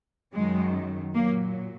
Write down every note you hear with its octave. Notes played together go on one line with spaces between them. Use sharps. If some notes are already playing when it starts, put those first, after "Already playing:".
F#2 D#3 F#3 G#3
A#2 F#3 A#3